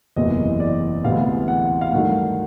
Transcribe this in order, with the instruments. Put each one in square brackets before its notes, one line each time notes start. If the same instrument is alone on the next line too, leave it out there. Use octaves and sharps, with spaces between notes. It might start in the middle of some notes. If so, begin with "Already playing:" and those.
[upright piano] F#1 E2 C3 E3 G#3 D#5
D5
D2 C3 E3 G#3 B3 F5
F#5
F5
G2 D#3 F#3 A3 F#5